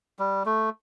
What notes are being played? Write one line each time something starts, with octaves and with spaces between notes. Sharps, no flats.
G3
A3